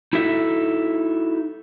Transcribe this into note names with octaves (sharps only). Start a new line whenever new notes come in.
D#4 E4 F#4 A4 E5